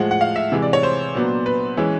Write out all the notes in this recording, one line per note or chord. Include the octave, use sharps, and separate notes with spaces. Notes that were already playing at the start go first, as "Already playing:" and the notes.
Already playing: A2 F3 G#3 F#5
F#5
F5
E5
C3 E3 G#3
D5
C#5
C5
A#2 F#3 B3 D4
B4
E3 G#3 C#4